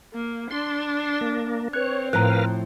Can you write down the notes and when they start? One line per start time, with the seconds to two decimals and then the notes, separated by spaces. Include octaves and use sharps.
0.13 A#3
0.51 D4 C6
1.21 A#3
1.73 C4 B4 C#5 F#6
2.13 A2 F3 A#4 B4 F5 A#5 F#6